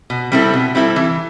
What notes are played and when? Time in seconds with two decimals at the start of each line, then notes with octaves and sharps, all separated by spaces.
0.10 B2
0.32 G3 C4 E4 A4
0.54 B2
0.75 G3 C4 E4 A4
0.96 E3